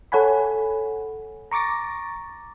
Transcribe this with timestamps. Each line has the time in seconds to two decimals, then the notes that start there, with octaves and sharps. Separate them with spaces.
0.12 A4 C#5 F#5 G#5 B5
1.51 A#5 C#6 D6 A6 A#6